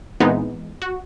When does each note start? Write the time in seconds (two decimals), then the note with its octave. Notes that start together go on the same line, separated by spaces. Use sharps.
0.20 A#2 E3 G#3 B3 C4 D#4
0.82 F#4